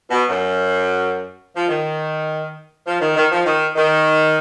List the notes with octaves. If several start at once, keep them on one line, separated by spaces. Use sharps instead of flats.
B2
F#2
F3
D#3
F3
D#3
D#3
F3
D#3
D#3